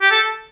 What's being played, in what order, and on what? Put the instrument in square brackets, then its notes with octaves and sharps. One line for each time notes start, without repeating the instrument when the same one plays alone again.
[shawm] G4
A4